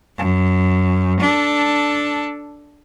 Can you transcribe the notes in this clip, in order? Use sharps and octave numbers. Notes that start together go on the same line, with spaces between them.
F#2
D4 A4